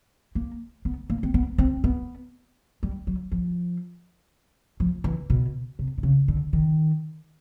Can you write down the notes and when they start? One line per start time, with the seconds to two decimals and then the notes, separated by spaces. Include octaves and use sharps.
0.35 A#3
0.85 B3
1.10 A#3
1.23 C4
1.34 B3
1.58 C4
1.84 B3
2.83 G3
3.07 F#3
3.32 F3
4.80 F3
5.04 E3
5.30 B2
5.79 C3
5.98 C3
6.03 C#3
6.28 D3
6.53 D#3